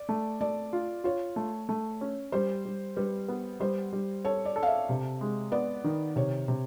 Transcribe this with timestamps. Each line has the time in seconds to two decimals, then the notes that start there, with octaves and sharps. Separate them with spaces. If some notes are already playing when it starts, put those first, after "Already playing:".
Already playing: D5
0.09 A3
0.41 A3 D5
0.73 F4
1.04 F4 C#5
1.36 A3
1.69 A3
2.01 C#4
2.32 G3 C5
2.65 G3
2.96 G3 B4
3.29 B3
3.60 G3 C5
3.93 G3
4.25 A4 C#5
4.45 D5
4.56 A4
4.63 F5
4.67 E5
4.89 C3
5.21 G#3
5.52 B3 D5
5.84 D#3
6.16 C3 C#5
6.48 C3